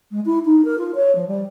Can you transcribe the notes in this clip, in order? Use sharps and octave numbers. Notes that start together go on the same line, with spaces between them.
G#3
E4
D#4
A#4
F4
C#5
F3
G3